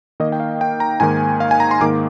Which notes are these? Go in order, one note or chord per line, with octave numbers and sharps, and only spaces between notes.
D#3 A#3 D#4 D#5
G5
F5
G5
A#5
G#2 D#3 A#3 G#5
F5
G#5
A#5
C6
G#2 D#3 A#3 D6